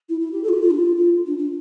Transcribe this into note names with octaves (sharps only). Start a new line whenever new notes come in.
E4
E4
G4
A4
F4
G4
F4
D4
F4
F4
D4
D4